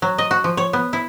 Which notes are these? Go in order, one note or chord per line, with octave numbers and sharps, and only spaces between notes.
F#3
D#5
F#4
F3
C#5
B3
E4